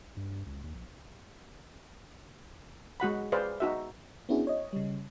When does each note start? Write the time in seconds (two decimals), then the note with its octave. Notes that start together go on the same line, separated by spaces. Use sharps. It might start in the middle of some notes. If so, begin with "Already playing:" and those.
0.17 G2
0.46 C#2
0.64 D#2
0.75 A#1
3.00 G#3 F#4 F#5 B5
3.32 G#4 B4 C5 D5 F5
3.60 D#4 F#4 E5
4.29 B3 C#4 D4 E4 F#4 G#4
4.47 C#5 D#5
4.73 C#3 G3